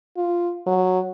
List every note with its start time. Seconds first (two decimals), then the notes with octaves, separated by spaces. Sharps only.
0.17 F4
0.67 F#3